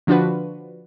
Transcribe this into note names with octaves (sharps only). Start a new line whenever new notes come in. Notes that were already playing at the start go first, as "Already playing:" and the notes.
D3 F3 D4 F4 F#4 B4